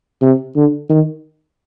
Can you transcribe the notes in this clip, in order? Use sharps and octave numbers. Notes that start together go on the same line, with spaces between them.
C3
D3
D#3